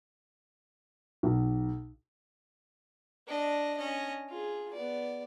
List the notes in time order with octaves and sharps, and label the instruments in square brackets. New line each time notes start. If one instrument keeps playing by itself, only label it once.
[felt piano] B1
[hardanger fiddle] D4 D#5
C#4 D#5
F4 G#4
B3 D5